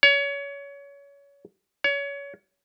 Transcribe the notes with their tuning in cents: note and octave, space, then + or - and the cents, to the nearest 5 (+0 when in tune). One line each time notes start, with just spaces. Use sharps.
C#5 +25
C#5 +25